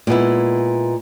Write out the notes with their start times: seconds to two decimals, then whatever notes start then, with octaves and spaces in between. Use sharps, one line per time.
0.07 A#2 G#3 B3 E4